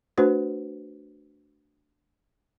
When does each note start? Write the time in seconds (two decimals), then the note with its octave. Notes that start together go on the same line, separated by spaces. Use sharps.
0.18 A3 D4 F#4 B4 C5